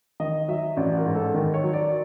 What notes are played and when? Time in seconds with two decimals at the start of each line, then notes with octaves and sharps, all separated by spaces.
0.20 D#3 D#5
0.48 F#3 E5
0.77 A1 D5
0.97 A#4
1.05 G#2
1.15 A4
1.34 D#3 A#4
1.54 C#5
1.64 F#3
1.73 D5